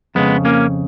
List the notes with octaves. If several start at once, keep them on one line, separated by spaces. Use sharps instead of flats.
F2 C#3 G#3 B3
A#3 C#4